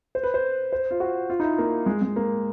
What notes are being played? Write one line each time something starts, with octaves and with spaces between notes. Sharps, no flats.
C5
B4
C5
C5
F4
F#4
F4
D#4
E4
A#3
G#3
G#3
A#3